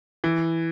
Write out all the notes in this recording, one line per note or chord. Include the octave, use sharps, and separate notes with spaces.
E3